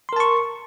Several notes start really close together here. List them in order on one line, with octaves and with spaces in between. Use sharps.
C6 A#4 A5 C#6